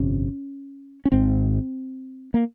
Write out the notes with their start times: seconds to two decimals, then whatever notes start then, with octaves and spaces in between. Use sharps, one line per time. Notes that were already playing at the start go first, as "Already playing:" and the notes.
Already playing: G1 F2 C3 C#4
1.05 C#4
1.12 G#1 G#2 C4
2.34 A#3